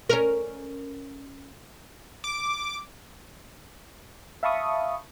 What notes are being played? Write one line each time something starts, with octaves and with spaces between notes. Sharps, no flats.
C#4 A#4
D6
E5 F5 A5 B5 C#6 D#6